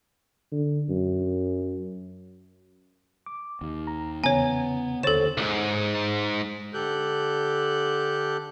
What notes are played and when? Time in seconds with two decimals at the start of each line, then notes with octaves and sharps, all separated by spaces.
0.52 D3
0.89 F#2
3.26 D6
3.61 D#2
3.87 A#5
4.24 E2 C#3 B3 C#5 G#5 A#5
5.03 D#2 D3 A4 C5 C#5 A6 E7
5.37 C2 G#2
6.74 D3 G4 A4 F#6 G6